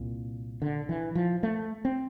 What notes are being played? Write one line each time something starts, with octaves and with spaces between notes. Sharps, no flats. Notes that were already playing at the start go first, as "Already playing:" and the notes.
Already playing: C2 A#2
D3
E3
F3
A3
C4